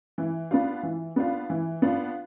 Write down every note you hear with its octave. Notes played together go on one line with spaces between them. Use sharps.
E3
B3 D4 F4
E3
B3 D4 F4
E3
B3 D4 F4